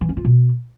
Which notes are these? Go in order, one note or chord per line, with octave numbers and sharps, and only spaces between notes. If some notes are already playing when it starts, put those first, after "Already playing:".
E3
C#4
F4
B2